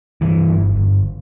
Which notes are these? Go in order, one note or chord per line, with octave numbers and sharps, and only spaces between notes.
G2 E3
G1
G1